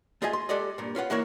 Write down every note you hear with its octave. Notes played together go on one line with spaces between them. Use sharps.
A3 F4 G#4 D#5 E5 G#5
C6
G#3 G4 A4 D5 D#5
G2 A#2
C#4 F4 B4 F#5
E3 A#3 E4 F#4 A#4 C#5